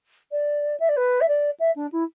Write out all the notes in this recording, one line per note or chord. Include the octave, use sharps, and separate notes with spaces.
D5
E5
D5
B4
E5
D5
E5
D4
E4